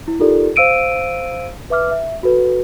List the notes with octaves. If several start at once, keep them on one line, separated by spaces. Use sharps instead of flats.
E4
D#4 F4 G4 A4 A#4 D5
C5 F5 E6 D7 D#7
B4 E5 D6 F6
E5
F#4 A4 B4